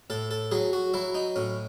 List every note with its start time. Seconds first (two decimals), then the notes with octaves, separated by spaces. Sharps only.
0.10 A2 A4
0.31 A4
0.51 F#3 G#4
0.73 F#4
0.94 F#3 E4
1.15 D#4
1.36 A2 C#4